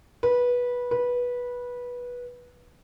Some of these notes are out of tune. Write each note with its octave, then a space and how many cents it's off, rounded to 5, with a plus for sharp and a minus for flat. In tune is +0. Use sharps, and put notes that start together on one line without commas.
B4 -15
B4 -15